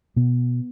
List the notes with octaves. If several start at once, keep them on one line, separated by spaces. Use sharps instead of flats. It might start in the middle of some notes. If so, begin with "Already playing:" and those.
B2 B3